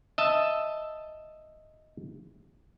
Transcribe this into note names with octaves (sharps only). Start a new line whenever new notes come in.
D#5 E5 A5